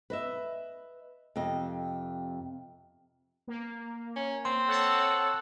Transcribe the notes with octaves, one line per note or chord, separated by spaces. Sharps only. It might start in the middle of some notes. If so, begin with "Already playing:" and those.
B4 D#5 E5
F2 C3 D#5
A#3
C#4
C4 C6
A4 C#5 F#5 A5